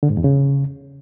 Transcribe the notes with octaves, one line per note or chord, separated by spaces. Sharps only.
D3
G#2
E2
C#3